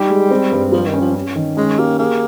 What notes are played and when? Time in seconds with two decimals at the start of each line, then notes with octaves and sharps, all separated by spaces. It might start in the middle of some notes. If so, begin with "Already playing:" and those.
Already playing: G3 D#4 G4
0.10 G#3
0.31 C4
0.52 G2
0.72 F3 G3
0.86 D#3
0.94 C#4
1.01 F3
1.15 C#4
1.35 D#3
1.57 G#3 C#4
1.79 A#3 G4
1.99 A#3 G#4